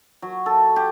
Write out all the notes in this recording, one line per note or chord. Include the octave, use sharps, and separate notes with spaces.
F#3
A4
G4